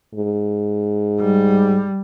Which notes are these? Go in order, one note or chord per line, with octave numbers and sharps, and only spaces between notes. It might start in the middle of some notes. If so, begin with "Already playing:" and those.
G#2
G3